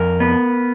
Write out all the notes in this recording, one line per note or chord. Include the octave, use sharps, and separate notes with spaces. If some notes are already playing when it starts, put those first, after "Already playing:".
Already playing: F2 A#4
B3